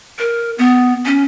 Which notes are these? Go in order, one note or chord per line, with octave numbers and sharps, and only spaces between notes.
A#4
B3
C#4